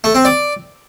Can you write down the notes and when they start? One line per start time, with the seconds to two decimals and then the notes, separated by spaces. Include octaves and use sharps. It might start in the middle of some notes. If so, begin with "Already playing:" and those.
0.04 A3
0.15 C4
0.25 D5